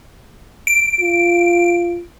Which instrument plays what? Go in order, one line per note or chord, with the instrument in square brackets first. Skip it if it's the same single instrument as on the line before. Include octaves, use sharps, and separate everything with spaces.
[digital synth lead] D7
[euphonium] F4